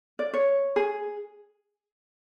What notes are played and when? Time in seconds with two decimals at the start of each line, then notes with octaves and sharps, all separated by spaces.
0.19 D5
0.33 C#5
0.76 G#4